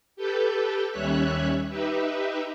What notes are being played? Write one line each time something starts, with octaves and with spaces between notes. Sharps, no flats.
G4 A4 B4 G5
D#2 G3 C#4 C#5 E5 F#6
D#4 G4 B4 E5